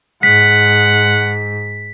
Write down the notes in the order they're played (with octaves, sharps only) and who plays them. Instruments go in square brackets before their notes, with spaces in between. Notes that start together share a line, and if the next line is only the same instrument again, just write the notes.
[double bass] G#2 [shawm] F#5 [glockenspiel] B6